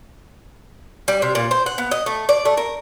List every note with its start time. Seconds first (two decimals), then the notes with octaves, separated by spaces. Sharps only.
1.08 G3
1.22 C3
1.35 A#2
1.51 C5
1.66 F#5
1.78 B3
1.91 D#5
2.06 A3
2.29 D5
2.45 A3
2.57 A#4